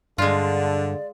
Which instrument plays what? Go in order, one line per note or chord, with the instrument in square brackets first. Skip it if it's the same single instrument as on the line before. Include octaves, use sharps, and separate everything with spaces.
[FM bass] G2 [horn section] D3 [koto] G#3 F4 [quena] D5